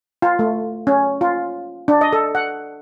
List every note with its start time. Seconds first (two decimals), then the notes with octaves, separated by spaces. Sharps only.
0.22 F4
0.39 A3
0.87 C#4
1.21 F4
1.88 D4
2.01 D#5
2.13 A4
2.35 F#5